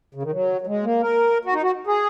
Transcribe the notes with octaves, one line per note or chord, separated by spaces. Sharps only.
C#3
D#3
F#3
F#3
G#3
A#3
A#4
F#4
D#4
F#4
G#4